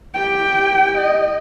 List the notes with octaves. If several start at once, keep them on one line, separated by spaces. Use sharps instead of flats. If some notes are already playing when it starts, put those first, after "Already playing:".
G4 G5
D#5